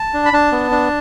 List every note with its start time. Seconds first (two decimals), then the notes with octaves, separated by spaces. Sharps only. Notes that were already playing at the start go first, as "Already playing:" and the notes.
Already playing: A5
0.14 D4
0.25 B5
0.33 D4 A5
0.52 B3
0.71 D4